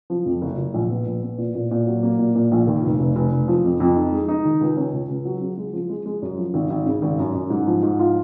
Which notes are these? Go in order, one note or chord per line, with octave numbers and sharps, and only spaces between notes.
F3
F2
F#1
F#1
A#1
B3
A#1
B3
A#2
A#2
A#2
F#3
A#3
A#2
A#2
A#1
D#2
F1
F1
F1
F1
F3
F2
F2
D#4
G#3
D#4
D#3
C#2
C#4
C#2
C#2
F#3
C#3
G#3
F3
G#3
G#3
F#2
F3
G#1
G#1
C#3
G#1
F#2
F#2
G#2
F3
G#2
F4